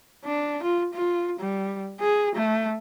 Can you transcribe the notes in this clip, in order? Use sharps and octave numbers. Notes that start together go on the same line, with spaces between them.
D4
F4
F4
G3
G#4
A3